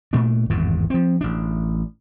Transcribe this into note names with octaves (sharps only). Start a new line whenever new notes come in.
A#2 A3 D4
G#1 E2 G2 D3
F3 C4
A1 D4